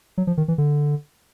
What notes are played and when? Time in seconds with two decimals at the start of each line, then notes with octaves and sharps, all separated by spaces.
0.18 F#3
0.27 F3
0.37 D#3
0.48 E3
0.58 D3